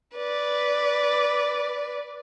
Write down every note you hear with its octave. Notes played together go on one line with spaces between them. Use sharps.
B4 D5